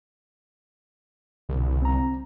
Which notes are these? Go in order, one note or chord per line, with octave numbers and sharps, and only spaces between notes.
C2 B2 D3
C4 A#5